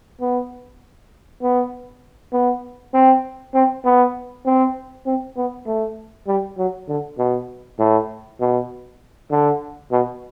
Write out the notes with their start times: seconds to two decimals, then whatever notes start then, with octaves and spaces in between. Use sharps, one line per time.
0.21 B3
1.42 B3
2.33 B3
2.94 C4
3.55 C4
3.85 B3
4.46 C4
5.06 C4
5.37 B3
5.66 A3
6.28 G3
6.58 F#3
6.89 D3
7.18 B2
7.79 A2
8.40 B2
9.31 D3
9.92 B2